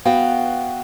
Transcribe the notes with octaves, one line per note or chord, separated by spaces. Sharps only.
B3 F#4 F5 G5